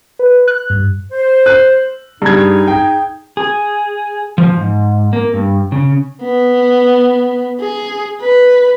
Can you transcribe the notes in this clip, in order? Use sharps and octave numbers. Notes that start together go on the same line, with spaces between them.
B4
F#6
G2
C5
F#6
G2 D#4 G#4 G#6
G5
G#4
F3
G#2
A#3
G2
C#3
B3
G#4
B4